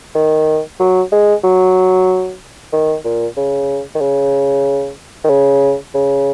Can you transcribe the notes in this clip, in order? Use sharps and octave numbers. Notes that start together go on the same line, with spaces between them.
D#3
F#3
G#3
F#3
D#3
A#2
C#3
D#3
C#3
D#3
C#3
C#3